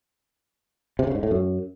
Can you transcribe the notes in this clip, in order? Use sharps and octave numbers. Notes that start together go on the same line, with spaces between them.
C3
C#3
G#2
A2
F#2